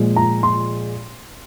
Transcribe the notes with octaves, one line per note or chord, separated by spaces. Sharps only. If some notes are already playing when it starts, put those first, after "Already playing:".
Already playing: A#2 F3 G#3
A#5
C6